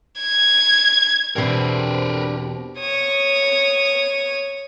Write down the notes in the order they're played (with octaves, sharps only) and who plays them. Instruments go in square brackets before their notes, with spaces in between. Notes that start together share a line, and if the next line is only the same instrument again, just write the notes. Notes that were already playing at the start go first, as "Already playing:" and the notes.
[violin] G#6
[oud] E2 B2 C4 [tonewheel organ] D4 G4 [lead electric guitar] A#4 B4
[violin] C#5 D#6